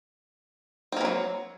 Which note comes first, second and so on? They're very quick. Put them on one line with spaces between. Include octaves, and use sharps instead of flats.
C4 A#3 E3 F#3